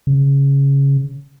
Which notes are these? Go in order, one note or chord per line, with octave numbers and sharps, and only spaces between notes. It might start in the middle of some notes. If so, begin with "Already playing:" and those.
C#3